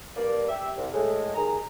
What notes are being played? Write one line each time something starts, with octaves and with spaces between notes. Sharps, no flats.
G2 A#3 D5
G4 E5
C2
A2 G#3
D#2 D#3 G#4 A#5